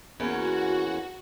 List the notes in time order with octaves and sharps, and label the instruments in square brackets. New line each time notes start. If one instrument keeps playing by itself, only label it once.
[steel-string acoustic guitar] E2 A#3 C#4 [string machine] F#4